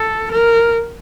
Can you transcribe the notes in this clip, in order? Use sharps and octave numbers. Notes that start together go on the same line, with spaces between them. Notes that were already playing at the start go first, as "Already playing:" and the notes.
Already playing: A4
A#4